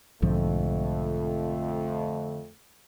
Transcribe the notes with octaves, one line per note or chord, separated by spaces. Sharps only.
B1 F2 G#2 D3 F3 A3